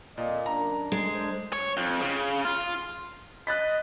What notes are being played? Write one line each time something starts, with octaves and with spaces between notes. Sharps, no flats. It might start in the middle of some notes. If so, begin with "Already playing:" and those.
F2 A#2 D5 D#5
F#2 D4 A#5
G#3
D4 C5
C#5
F2
C#3
F4
D#5 F#6 A6 B6